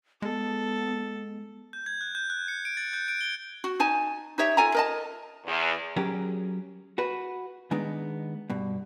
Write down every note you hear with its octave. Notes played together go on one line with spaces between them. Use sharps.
G#3 B3 A4
G6
G#6
F#6
G6
F#6
C#7
D7
A6
G6
D7
G7
F#4
D#4 G#5 A5
D#4 G4 C#5 E5
F4 A4 G#5 A#5
A#4 D#5 A5
E2
F#3 C#4 G4 G#4 A#4
F#4 B4
D#3 G#3 B3 D4 D#4
G2 B2